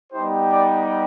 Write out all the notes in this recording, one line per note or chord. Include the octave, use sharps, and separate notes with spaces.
G3 B3 D#4 G4 C5
D5